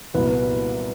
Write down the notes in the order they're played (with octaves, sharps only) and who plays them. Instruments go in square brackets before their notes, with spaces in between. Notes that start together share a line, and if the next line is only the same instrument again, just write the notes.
[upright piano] C2 A#2 F#3 B3 E4 [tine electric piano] B4